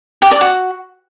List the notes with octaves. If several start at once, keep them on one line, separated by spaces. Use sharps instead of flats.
G4
D5
F#4